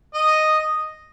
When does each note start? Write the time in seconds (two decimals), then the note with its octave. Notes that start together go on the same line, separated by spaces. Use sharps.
0.14 D#5